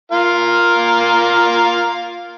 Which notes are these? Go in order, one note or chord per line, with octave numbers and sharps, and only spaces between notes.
F4 A#4 F5